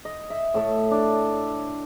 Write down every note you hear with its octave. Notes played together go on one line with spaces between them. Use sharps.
D#5
E5
A2 A4 C#5
D4